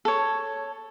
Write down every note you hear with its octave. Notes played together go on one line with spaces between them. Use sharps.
A4 C#5